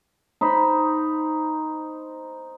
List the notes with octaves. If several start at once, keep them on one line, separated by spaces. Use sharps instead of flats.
D#4 C5 B5